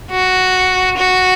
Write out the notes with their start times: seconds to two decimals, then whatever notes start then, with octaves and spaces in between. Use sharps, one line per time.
0.11 F#4
0.97 F#4